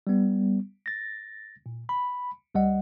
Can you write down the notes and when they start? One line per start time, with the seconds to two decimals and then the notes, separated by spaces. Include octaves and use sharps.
0.07 G3 B3
0.86 A6 A#6
1.66 A#2
1.89 B5
2.55 D2 G3 D#5 F#5